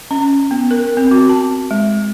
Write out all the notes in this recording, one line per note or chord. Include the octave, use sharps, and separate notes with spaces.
C#4
B3
A#4
C4
F#4
A5
G#3